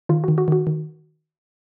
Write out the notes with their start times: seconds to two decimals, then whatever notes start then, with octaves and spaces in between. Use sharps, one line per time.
0.09 D#3 F4
0.24 D#3 F#4
0.38 F#4
0.48 D#3 F#4
0.67 D#3